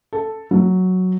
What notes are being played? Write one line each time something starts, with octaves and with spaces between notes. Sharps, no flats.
A4
F#3